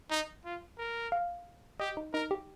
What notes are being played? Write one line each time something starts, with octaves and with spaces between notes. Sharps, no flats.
D#4
F4
A#4
F5
G4 D#5
D#4
D#4 A#4
G4